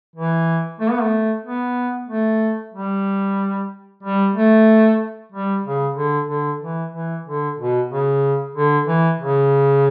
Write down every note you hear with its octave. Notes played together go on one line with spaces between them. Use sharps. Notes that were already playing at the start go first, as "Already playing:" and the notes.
E3
A3
B3
A3
B3
A3
G3
G3
A3
G3
C#3
D3
D3
E3
E3
D3
B2
C#3
D3
E3
C#3